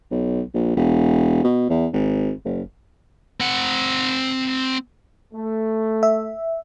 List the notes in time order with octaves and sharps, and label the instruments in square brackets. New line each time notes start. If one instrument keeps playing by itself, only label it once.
[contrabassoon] B1
A#1
E1
B2
E2
G#1
F#1
[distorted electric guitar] C4 F#5
[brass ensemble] A3
[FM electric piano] E5